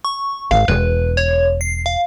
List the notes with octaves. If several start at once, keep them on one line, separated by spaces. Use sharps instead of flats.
C#6
G#1 F5
E1 B4
C#5
C7
F5